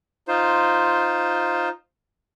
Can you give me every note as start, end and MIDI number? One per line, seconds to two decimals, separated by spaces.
0.28 1.69 63
0.28 1.69 65
0.28 1.69 72